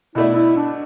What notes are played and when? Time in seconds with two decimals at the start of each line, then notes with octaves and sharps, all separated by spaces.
0.15 B2 A3 D4 E4
0.36 E4
0.57 D4